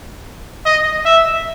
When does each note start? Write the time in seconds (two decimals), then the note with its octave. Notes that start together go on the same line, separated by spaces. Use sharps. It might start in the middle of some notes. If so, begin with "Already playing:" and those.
0.66 D#5
1.05 E5